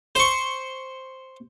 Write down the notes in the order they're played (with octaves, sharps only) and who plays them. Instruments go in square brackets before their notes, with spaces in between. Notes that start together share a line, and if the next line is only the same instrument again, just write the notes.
[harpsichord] C5 C#6